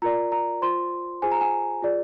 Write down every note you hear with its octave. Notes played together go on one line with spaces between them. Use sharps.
F4 A#4 D5 A#5
A#5
F4 C5 C6
F4 G#4 C5 G#5
A#5
G#5
F4 G#4 D5